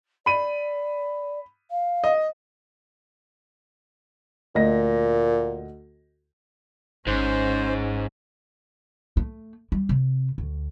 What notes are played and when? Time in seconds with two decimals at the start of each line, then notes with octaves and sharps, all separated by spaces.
0.26 D5 B5 D#7
1.71 F5
2.04 D#5
4.55 D2 A#2 D#5 A#6
7.07 G#1 G#2 C#4 C5
9.17 A3
9.72 G3
9.89 C3
10.38 D2